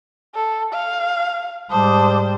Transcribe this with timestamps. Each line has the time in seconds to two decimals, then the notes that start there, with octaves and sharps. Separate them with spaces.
0.35 A4
0.73 F5
1.71 G#2 G3 C5 A5 D6 D#6